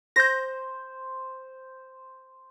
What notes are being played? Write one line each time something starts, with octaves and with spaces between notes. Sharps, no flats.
C5 G6 A#6